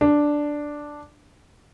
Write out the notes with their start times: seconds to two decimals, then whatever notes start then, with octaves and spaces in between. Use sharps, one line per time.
0.01 D4